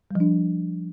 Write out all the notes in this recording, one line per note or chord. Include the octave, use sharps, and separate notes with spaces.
F3 G3 D4